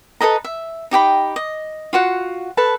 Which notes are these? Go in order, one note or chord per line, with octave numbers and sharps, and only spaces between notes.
A4 B4 D#5 A#5
E5
D#4 G4 G5 B5
D#5
F4 F#4 F#5
A4 B4 A5